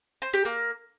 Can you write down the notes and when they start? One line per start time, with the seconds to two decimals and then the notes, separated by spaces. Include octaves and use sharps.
0.22 C5
0.33 G4
0.45 A#3